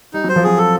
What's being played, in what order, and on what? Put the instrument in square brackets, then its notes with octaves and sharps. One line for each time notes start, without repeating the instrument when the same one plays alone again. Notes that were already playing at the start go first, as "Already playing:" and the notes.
[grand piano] G3 [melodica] D#4
[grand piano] F#3
[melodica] C5
[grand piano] F3
[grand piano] F#3 [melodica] G#4
[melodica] A4